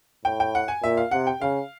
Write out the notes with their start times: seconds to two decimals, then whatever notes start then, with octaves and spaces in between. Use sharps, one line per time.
0.25 A2 G5
0.40 G5
0.55 F#5
0.68 G#5
0.83 A#2 E5
0.97 F5
1.11 C3 F#5
1.27 G5
1.41 C#3 F5